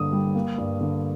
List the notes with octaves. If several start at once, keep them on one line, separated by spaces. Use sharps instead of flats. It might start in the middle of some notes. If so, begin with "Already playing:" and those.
Already playing: G2 D3 A#3 D#6
G3
A#3
G2
D3